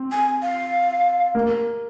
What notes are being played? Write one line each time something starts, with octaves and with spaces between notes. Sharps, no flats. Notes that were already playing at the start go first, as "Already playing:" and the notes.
Already playing: C4
G#5
F5
A#3